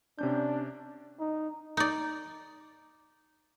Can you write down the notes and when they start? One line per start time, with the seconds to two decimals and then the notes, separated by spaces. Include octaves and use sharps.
0.19 C3 C#4 D4 G6
1.20 D#4
1.77 D#4 D5